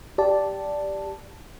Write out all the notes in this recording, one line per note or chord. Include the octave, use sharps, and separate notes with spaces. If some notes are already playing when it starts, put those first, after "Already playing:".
G4 D5 A5